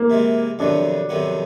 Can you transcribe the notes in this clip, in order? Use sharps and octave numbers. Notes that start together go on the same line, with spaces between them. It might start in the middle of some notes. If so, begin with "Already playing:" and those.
Already playing: A#3
C3 E3 G#3
F2 C3 D#3 F#3 B3 D4
F2 C3 D#3 F#3 B3